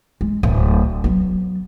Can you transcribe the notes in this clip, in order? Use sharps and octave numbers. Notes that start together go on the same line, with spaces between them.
G#3
D1 A3
F#3 B3